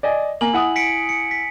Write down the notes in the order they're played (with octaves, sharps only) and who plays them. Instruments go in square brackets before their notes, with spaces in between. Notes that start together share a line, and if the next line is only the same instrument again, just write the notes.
[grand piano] D5 D#5 G#5
[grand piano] A#3 [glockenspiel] G#5 F#7
[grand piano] E4 F#5 D#6
[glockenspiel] B6 C#7 D7
C#7
B6